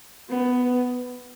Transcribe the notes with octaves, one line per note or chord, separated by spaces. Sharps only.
B3